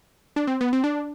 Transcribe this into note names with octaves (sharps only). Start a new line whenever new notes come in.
D4
C4
B3
C4
D4